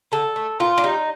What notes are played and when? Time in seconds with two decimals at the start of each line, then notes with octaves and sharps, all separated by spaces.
0.12 D3 A4
0.36 A3
0.60 A#2 F4
0.78 D4
0.84 G3 D#4